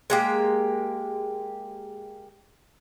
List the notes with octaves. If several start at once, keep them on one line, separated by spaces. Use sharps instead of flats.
G#3 A#3 G4